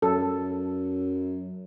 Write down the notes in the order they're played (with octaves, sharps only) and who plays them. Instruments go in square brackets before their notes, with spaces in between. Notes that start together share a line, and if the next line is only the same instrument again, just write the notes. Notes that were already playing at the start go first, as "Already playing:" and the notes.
[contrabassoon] F#2 [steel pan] A4